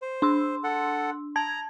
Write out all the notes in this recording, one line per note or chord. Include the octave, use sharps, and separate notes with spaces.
C5
D4 C6 E6
A4 F#5
A5 A#5 G#6